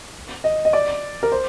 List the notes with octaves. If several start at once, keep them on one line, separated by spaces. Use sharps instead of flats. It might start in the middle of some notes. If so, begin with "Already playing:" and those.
D#5
D#5
D5
A#4
C5